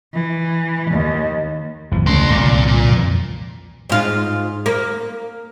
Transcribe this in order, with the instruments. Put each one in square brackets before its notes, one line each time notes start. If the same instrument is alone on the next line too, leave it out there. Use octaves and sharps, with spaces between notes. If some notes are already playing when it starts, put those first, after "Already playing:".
[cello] E3
D#2
[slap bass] G1 E2 F3
[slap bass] C#2 C#4 [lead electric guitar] A3 C6
[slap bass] G#1 D2 [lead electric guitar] A#2
[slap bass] C2 D3
[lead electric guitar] A#2
[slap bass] F2 A#2 E3
[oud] G#2 F4
A#3